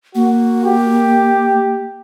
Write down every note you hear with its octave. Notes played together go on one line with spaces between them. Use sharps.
A#3 F#4
G4